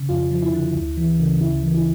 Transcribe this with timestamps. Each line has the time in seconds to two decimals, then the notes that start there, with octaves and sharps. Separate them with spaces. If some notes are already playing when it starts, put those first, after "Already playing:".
Already playing: C#3
0.09 F2 F4
0.31 F3
0.42 E4
0.53 D3
0.76 D2
0.97 E3
1.20 C#3
1.41 D2 E4
1.63 E3
1.74 E4